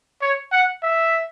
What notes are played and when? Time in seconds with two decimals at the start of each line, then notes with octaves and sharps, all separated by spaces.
0.21 C#5
0.52 F#5
0.83 E5